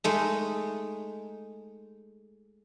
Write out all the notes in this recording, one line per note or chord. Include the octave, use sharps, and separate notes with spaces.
G#3 A3 D#4